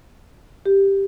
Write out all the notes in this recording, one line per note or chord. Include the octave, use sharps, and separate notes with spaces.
G4